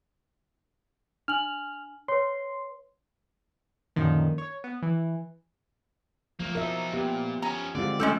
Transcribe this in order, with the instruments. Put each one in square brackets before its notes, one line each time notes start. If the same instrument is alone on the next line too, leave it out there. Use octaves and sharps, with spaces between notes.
[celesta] D4 G#5 F#7 [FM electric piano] F6
[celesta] B4 C#5 [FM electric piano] C6
[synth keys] F#2 A#2 D3 D#3 F3
C#5
B3
E3
[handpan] F3 [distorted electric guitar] A3 A#3
[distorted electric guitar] B2 D#4 [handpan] A#4 E5
[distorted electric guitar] A#2 [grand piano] B3 [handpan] G4
[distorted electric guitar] B3 C#4 [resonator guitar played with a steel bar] A#5
[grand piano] D3 G3 F4 [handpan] G#3 C4 [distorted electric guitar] D5
[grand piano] F3 G6 [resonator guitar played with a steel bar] G#3 C#4 A4 [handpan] A3